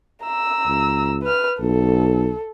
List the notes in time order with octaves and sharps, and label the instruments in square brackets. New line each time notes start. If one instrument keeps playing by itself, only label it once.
[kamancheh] A#5 E6
[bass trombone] C#2
[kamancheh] B4 F6
[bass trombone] B1 [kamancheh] A4